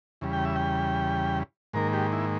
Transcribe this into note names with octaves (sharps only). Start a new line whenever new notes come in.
E2 C#3 G3
G5
E5
G5
G#2 D#3 A#3 A#4
G4
E4